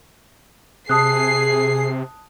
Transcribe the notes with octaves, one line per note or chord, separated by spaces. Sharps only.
C3 G#4 A5 D#6 F#6 C7